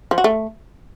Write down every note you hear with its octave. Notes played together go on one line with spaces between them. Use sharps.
F3
F#4
A3